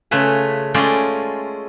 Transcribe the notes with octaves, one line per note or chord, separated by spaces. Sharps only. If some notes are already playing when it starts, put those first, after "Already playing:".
C#3 A3 F4 B4 G#5
G#3 A3 C#4 F4 D5 G5